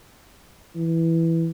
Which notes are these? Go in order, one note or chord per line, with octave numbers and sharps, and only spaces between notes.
E3